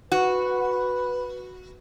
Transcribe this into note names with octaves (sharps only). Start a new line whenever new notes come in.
F#4 B4